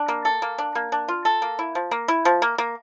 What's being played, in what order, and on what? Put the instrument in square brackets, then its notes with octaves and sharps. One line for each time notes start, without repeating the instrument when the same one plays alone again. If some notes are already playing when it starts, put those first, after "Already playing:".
Already playing: [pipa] D4
A#3
A4
A#3
D4
A#3
D4
F4
A4
A#3
E4
F3
A#3
E4
F3
A#3
A#3